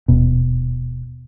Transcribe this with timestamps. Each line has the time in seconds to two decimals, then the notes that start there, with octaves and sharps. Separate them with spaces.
0.08 D#1 B2